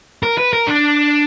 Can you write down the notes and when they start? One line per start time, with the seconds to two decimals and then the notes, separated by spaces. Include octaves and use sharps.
0.23 A#4
0.38 B4
0.53 A#4
0.67 D4